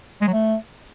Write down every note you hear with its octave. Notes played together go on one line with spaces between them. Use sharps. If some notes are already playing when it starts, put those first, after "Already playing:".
G#3
F#3
A3